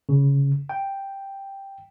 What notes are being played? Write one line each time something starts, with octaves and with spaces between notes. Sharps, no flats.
C#3
G5